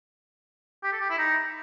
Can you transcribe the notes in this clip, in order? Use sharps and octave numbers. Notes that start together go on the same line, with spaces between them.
G4
A4
G4
E4
D#4